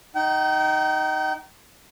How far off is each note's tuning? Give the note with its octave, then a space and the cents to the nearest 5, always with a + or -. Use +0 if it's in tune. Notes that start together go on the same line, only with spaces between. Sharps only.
D#4 +0 G5 -40